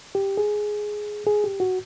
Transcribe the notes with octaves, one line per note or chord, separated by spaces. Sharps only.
G4
G#4
G#4
G4
F#4